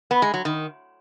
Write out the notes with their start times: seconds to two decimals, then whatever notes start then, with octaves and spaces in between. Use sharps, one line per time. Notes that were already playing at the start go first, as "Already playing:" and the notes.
0.11 B3
0.22 G#3
0.34 F#3
0.45 D#3